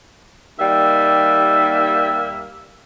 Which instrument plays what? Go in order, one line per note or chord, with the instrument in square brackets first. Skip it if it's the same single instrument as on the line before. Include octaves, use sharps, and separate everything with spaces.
[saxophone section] D#2 G3 A#3 E5